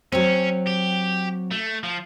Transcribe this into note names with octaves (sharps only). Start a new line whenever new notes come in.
F#3 C4 C#4
G4
A3
F3